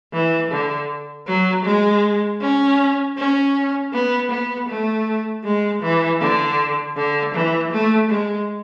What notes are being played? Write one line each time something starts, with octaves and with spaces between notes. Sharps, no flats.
E3
D3
F#3
G#3
C#4
C#4
B3
B3
A3
G#3
E3
D3
D3
E3
A3
G#3